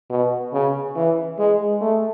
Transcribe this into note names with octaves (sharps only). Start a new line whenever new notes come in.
B2
C#3
E3
G#3
A3